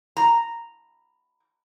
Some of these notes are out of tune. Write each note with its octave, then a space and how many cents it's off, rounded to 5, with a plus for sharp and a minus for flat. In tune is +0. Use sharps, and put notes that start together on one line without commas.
A#5 -10